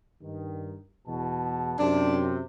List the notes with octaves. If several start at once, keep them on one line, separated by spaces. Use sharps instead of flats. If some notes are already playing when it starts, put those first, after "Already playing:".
G2 D#3
E2 B2 A5
F#2 C3 D4